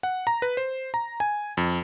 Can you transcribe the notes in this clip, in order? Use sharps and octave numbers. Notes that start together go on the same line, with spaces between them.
F#5
A#5
B4
C5
A#5
G#5
F2